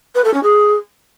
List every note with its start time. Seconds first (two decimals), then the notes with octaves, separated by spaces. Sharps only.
0.15 B4
0.24 A4
0.34 C#4
0.43 G#4